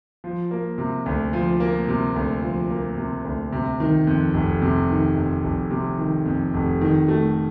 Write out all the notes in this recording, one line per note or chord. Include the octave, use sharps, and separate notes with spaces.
F3
A#3
C3
D2
F3
A#3
C3
D2
F3
A#3
C3
D2
C3
D#3
F2
F1
C3
D#3
F2
F1
C3
D#3
F2
F1
D#3
A3